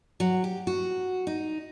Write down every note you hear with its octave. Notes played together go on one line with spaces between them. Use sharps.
F#3
G4
F#4
D#4